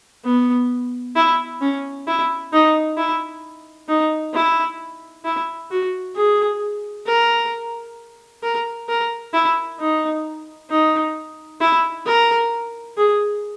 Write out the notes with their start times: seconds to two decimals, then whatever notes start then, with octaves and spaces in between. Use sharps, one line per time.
0.25 B3
1.16 E4
1.61 C#4
2.07 E4
2.52 D#4
2.97 E4
3.88 D#4
4.34 E4
5.25 E4
5.70 F#4
6.16 G#4
7.06 A#4
8.43 A#4
8.88 A#4
9.34 E4
9.79 D#4
10.70 D#4
11.61 E4
12.06 A#4
12.97 G#4